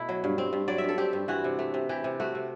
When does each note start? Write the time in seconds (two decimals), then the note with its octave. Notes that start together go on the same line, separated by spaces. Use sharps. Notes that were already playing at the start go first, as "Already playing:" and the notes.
Already playing: B2 A3 E4
0.09 F#3
0.24 G2
0.38 C4
0.53 G2
0.68 F#3 D5
0.78 E5
0.84 G2 A4
0.98 C4 G4
1.13 G2
1.28 E3 F#4
1.44 C3
1.59 A3
1.74 C3
1.89 E3 G4
2.04 C3
2.20 A3 F#4
2.35 C3